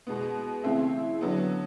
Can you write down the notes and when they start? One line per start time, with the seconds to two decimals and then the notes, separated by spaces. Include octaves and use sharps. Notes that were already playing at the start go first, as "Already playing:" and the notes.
0.07 B2 G#3 B3
0.64 C#3 E3 A3 C4 E4
1.21 D3 F#3 B3